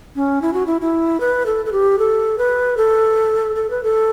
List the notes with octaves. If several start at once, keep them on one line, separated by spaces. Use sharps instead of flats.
C#4
E4
F#4
E4
E4
B4
A4
A4
G4
A4
B4
A4
A4
B4
A4